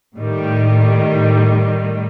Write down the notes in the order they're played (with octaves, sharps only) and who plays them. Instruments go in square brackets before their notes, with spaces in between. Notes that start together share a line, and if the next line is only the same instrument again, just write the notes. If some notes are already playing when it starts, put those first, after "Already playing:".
[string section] A2 D#3 G3